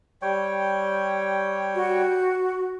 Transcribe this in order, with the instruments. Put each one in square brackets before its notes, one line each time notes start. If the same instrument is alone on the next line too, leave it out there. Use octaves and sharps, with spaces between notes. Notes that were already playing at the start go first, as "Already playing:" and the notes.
[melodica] G3 C#5 G5
[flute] F#4